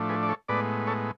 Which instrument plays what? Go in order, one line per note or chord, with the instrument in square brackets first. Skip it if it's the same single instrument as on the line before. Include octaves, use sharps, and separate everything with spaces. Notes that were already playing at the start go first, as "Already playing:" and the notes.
Already playing: [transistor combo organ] A2 F3 A3 D4
G#4 B4
D5
A4 C#5
A2 G#3 B3 B4 D5
A4 C#5